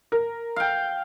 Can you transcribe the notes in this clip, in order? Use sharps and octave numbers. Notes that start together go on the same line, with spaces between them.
A#4
F5 G5